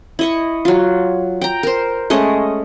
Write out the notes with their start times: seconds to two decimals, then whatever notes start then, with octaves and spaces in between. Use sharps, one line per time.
0.19 E4 D#5 C#6
0.65 F#3 F4
1.41 G5 A#5
1.63 A#4 C5
2.10 G#3 A3 C#4 D#5